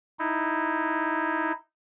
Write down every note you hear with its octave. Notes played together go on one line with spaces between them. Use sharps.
D#4 E4